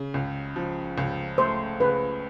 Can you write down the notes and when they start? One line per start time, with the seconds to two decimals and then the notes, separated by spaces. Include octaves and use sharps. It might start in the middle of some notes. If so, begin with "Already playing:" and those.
Already playing: C#3
0.14 C#2
0.56 F3
0.98 C#2
1.38 A3 C5
1.80 C#3 B4